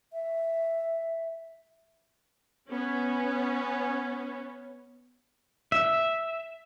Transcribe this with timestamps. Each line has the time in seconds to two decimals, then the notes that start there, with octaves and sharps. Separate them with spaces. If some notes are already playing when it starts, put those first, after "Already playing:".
0.13 E5
2.68 B3 C#4
5.72 E5